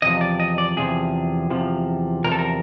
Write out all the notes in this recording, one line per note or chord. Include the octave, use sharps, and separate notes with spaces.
E2 C3 F3 D#5
D5
D#5
D5
E2 C3 F3 G#4
E2 C3 F3
E2 C3 F3 A#4
A4
A#4